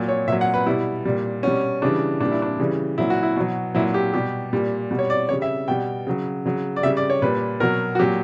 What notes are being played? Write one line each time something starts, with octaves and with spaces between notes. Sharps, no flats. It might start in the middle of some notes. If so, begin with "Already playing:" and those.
Already playing: A#2 F#3
C#5
A#2 F#3 E5
F#5
B4
B2 G3 E4
A#2 G3
B2 G3 C#4
C#3 E3 G3 D4
A#2 G3 D4
E4
D4
C#3 E3 G3
A#2 F#3 E4
F#4
E4
B2 F#3
A#2 F#3 E4
G4
B2 G3 G4
A#2 G3
B2 G3
C#5
D5
C#3 G3 C#5
E5
B2 G3 G5
C#3 F#3
C#3 F#3
D5
C#3 G3 E5
D5
C#5
A#2 G3 B4
B2 F#3 A#4
F#4
A#2 F#3 G4